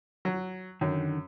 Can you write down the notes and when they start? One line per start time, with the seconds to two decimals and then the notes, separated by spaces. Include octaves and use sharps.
0.25 F#3
0.81 F#2 D3 D#3